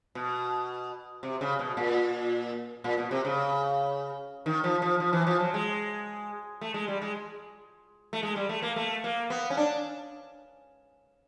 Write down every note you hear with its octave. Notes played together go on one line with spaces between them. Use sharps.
B2
C3
C#3
B2
A#2
A#2
B2
C3
C#3
D#3
F3
F3
F3
E3
F3
F#3
G#3
A3
G#3
G3
G#3
A3
G#3
G3
A3
A#3
A3
A#3
B3
C#4
D4